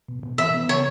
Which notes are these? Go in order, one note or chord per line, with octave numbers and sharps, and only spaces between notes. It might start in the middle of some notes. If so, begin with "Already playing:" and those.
B2
B2
E3 E5
B3
C#3 C#5